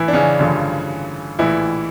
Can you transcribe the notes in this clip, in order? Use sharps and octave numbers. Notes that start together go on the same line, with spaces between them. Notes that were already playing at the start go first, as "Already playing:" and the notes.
Already playing: A#1 A2 E3 E4
D4
C#3 C#4
A1 G2 D3 F3
A#1 A2 E3 E4